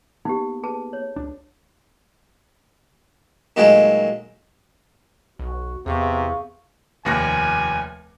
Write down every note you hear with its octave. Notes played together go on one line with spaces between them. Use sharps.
A#3 B3 D#4 G4
G#4 B4 A5
C#5
C#2 D4
A#2 D#3 F#3 G#3 A3
B1 F#4
E2 C3 B3 G#4 F5 C#6
F1 D#2 G#5 A#6